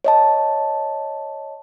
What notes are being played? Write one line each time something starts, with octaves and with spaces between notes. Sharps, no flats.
C#5 D#5 A5